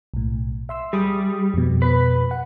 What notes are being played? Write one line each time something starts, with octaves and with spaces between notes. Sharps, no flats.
B1 A2
E5 C6 E6
G3 G#4 D#6
F2 B2
B4
F#5